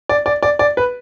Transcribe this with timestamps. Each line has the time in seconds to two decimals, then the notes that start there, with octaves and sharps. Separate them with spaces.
0.09 D5
0.26 D5
0.43 D5
0.59 D5
0.77 B4